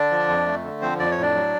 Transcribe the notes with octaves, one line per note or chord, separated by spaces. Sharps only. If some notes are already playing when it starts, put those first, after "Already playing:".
Already playing: D3 D4 D5
F3
F2
A3
D3
F3 C4 C5
F2 D5
C#5
A2 D4 D5
F#3